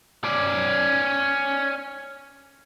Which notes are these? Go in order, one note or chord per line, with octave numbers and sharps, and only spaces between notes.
C#4 D5